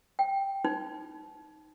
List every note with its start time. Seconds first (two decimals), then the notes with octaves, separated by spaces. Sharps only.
0.19 G5
0.65 D#4